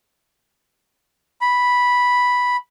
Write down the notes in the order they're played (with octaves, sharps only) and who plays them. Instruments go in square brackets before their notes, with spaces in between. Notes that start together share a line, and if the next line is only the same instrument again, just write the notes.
[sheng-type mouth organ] B5